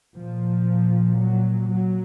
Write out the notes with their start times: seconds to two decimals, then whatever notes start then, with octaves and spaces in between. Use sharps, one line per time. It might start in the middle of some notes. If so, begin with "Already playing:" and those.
0.16 A#2 F3
1.18 F#3
1.68 F#3